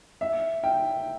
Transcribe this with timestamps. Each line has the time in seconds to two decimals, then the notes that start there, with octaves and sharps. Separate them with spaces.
0.21 E5
0.64 G5